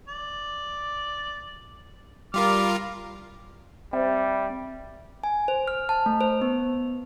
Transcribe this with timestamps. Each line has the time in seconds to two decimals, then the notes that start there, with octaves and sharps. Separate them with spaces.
0.08 D5
2.34 G3 F4 A#4 D6 F6
3.93 G3 C4 E5
5.24 G#5
5.48 C5
5.68 F6
5.89 A5
6.06 A3
6.21 C5
6.42 B3